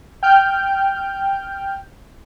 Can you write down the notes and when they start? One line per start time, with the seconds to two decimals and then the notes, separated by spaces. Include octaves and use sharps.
0.23 G5 F6 G6